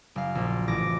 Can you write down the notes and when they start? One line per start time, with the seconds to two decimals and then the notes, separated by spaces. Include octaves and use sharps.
0.16 F#1 F5
0.35 A#1
0.68 A1 D6 A#6